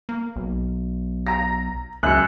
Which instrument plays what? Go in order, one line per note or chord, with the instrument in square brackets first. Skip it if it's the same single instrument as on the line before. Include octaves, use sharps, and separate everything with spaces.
[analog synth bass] A#3
B1
[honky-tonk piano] A#5 A#6
[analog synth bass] C#2 [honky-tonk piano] F#2 [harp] F#6 C#7